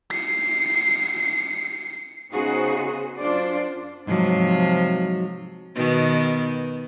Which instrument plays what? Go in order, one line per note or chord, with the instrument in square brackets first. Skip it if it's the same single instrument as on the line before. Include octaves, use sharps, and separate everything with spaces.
[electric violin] C7 C#7
[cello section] C#3 B3 D#4 F#4 G#4 C5
F#2 D4 F4 C5 D5
[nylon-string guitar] G#2 F#3 [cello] C3 F3
[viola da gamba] B2 D#3 B3